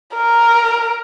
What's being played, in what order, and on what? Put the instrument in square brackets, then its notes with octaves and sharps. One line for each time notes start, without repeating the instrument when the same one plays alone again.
[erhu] A#4